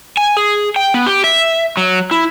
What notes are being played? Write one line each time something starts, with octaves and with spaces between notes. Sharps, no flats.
G#5
G#4
G5
B3
G4
E5
F#3
E4